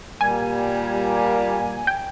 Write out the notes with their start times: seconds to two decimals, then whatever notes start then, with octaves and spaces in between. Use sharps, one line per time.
0.21 A#2 G3 A#3 G#5
1.87 G5